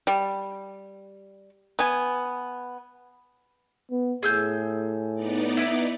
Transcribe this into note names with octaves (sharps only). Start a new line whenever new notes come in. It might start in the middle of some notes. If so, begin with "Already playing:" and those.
G3
B3 G#5
B3
A2 G#4 E6 G6
B3 D#4 D5
E4 B4